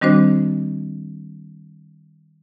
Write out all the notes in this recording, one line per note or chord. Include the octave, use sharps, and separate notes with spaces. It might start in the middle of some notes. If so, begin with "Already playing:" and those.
D#3 G3 C4 D4 F#4 C5